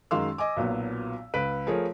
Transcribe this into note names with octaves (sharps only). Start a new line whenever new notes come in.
F#2 D#3 G#3 F5 C6 E6
D#5 G#5 D6
B1 A#2 F#3 B3
C#2 B4 B6 D7
F3 A3 G#4 A#4 C#5